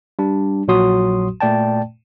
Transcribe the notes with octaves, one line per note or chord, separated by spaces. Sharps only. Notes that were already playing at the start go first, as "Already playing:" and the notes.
G3 D4
A#1 A#2 F#3 F#4 C6 D#6
A#2 A3 D5 G5 A5